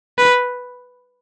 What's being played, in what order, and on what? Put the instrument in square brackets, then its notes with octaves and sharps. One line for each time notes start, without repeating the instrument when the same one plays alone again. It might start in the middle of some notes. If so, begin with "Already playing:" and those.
[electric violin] B4